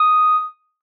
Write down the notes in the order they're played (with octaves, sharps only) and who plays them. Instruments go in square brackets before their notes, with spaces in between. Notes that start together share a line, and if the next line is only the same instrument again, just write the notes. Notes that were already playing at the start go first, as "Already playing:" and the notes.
Already playing: [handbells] D#6